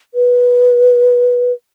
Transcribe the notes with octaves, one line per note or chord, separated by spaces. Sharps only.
B4